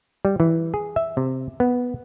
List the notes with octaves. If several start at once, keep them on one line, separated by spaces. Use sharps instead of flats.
G3
E3
G#4
E5
C3
B3